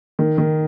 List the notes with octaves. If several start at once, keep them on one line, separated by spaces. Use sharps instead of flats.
D#3
D#3